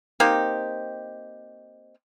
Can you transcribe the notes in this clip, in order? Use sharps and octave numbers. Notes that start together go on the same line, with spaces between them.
A#3 C4 D#4 G4